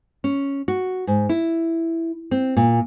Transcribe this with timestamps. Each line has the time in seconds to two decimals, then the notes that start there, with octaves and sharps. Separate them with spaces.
0.24 C#4
0.68 F#4
1.07 G#2
1.29 E4
2.31 C4
2.57 A#2